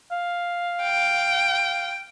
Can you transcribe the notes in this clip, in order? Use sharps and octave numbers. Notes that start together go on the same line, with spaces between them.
F5
G5